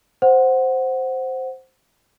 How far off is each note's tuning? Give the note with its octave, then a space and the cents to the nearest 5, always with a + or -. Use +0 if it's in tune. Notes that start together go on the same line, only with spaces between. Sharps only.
C5 +0 F#5 +0